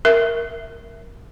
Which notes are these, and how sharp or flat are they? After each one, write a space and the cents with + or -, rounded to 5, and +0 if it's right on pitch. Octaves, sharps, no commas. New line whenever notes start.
A#4 +0 E5 +0